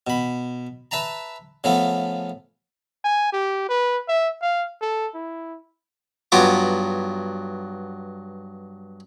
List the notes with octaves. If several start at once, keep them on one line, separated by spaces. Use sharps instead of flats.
B2 B5
B4 E5 A5 A#5
C#3 F3 A3 B3 A4
G#5
G4
B4
E5
F5
A4
E4
G2 F#3 B3 F4 A#5 D6